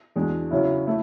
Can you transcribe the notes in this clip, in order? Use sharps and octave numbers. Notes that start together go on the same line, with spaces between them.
E2 B2 G#3 D4
C#3 F#3 C#4 E4
A3 E4